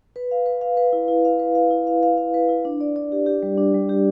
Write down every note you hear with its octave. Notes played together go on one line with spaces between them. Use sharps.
B4
F5
B4
F5
B4
E4
E4
F5
B4
F5
E4
F5
F5
F5
B4
E4
D4
D5
D5
G4
G4
G3
D4
G3
G4